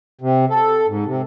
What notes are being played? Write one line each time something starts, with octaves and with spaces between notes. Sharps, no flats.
C3
A4
G#2
C3